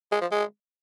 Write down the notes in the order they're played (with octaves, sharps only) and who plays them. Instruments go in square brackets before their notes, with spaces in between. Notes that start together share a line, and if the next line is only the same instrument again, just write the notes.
[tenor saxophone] G#3
F3
G#3